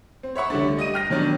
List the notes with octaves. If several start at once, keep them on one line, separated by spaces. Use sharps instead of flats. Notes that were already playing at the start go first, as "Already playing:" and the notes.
C4
C#5 E5 F#5 C#6
D3 G3 A3 D4
G3 D#5 D#6 D#7
G5 F6 A#6
B2 D#3 F#3 D4